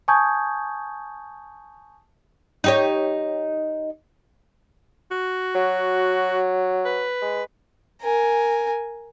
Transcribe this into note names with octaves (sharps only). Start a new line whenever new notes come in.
G#5 A5 C#6 D#6 G6 G#6
D#4 G4 C#5
F#4
F#3
B4
G#3
A#4 G#5